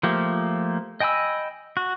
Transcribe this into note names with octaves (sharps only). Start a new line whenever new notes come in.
F3 A3 A#3 G4
D#5 G5 G#5 B5 E6
F#4